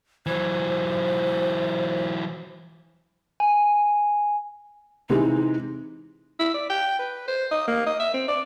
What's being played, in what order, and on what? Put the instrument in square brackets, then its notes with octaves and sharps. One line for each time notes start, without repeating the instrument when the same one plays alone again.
[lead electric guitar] E3 F#3 [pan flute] C5
[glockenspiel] G#5
[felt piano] C3 E3 G#3 [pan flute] D#4
[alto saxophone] E4
D5
G5
B4
C5
D#5
A#3
D#5
E5
C4
D5